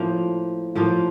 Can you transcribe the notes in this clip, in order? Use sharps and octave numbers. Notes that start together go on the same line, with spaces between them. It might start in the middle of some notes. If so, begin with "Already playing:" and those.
Already playing: A2 F3 A#3
A2 F3 A#3